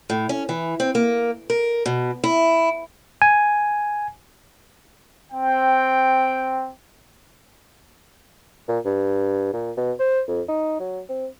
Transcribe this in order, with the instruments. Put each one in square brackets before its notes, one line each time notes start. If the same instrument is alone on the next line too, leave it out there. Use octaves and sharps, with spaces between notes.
[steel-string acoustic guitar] A2
C#4
E3
C4
A#3
A#4
B2
E4
[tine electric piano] G#5
[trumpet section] C4 G5
[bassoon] A#2
G2
A#2
B2
C5
F2
D#4
F#3
C4